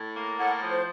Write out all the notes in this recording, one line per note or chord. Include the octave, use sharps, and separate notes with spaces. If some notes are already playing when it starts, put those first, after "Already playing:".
Already playing: A2
A#3
A2 F#5
F3
C5